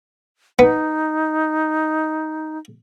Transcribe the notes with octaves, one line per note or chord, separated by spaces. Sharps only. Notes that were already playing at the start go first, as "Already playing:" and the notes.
B3 D#4